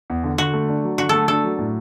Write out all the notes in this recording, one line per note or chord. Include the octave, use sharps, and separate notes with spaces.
E2
D3
D3 F#4
A3
D4
F#3
D3 F#4
A3 A4
D4 A4
F#3
A2